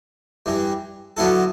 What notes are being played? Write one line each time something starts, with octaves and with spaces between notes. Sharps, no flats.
G2 E3 G3
D3 F#3 B3 E4 A4